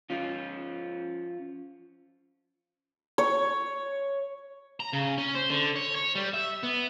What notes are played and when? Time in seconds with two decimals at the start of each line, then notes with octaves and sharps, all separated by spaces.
0.10 F3 C#4 F4
3.18 C#5
4.80 A#5
4.93 C#3
5.18 C#4
5.35 C5
5.50 D3
5.76 C#5
5.95 C#5
6.15 G3
6.34 E5
6.63 B3